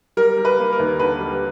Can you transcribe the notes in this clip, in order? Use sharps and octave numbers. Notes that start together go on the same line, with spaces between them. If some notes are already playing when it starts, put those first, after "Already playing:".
G3 A#4
G3
B4
A#3
A#4
D#2
D3 B4
G3